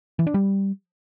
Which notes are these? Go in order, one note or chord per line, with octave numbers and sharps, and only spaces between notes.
E3
D4
G3